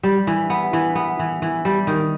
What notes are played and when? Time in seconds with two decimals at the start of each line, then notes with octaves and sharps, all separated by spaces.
0.03 G3
0.27 E3
0.50 B3
0.73 E3
0.95 B3
1.19 E3
1.42 E3
1.65 G3
1.87 D#3